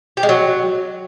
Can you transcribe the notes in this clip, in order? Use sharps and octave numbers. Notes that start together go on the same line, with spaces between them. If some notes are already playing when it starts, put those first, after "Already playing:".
G4
G#3
F#3